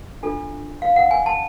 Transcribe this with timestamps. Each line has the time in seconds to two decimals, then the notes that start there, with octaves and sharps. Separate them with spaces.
0.23 D4 F4 A4
0.82 F5
0.96 F#5
1.11 G#5
1.26 A5